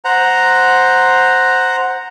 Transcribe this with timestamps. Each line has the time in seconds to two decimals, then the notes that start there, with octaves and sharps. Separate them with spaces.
0.05 C5 F#5 A#5